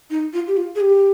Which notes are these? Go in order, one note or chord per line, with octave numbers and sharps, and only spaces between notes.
D#4
F4
G4
F4
G#4
G4